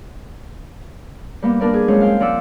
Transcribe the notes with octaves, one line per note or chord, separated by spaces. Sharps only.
G3 A#3 B3
A#3 D4 A#4 B4 D5
G#4
F#3 G#3 C4 C#4 F4
F5 G5
F3 F4 D5 F#5 E6